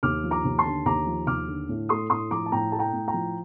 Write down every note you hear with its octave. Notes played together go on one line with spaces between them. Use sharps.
D#2 D6 F6
F3
A#5 D6
D#2
A5 C6
D3
D#2 A#5 D6
F3
D#2 D6 F6
D3
A2
A3 C6 D#6
A2 C6 D#6
F3 A#5 D6
A5
A2 G5 A#5
A3 A5
G5 A#5
A2
G5 A#5
F3